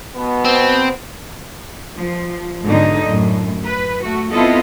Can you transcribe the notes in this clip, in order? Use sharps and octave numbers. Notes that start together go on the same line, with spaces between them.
B2 B3
C4
F3
G#2 B2 D3 D#4
F#2 A2
B4
A3 F#4
B3 C4 E4 F4 A4 D#5